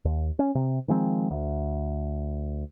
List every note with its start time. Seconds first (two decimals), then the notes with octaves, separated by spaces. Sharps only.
0.05 D#2
0.39 C#4
0.55 C3
0.88 D#3 F3 G#3 C4
1.31 D2